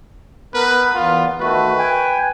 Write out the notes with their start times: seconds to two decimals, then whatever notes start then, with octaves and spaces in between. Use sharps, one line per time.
0.54 B3 A#4 B4
0.94 E2 B3 F4
1.41 D#3 A3 F#4 B4
1.78 G5 G#5